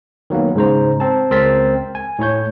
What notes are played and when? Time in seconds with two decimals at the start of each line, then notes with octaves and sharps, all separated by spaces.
0.30 D#3 F#3 A#3 B3
0.55 G#2 C#3 C5 A#5
1.00 C4 A5
1.30 C#2 C4 A#4 A6 B6
1.95 G#5
2.19 A2 E4 C#5 G6